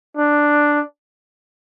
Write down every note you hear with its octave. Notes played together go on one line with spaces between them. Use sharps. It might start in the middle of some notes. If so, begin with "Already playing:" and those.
D4